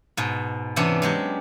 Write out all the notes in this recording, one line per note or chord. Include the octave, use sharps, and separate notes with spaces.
G#2 B2
C3 E3 B3 C#4 D4
F#3 G#3 G4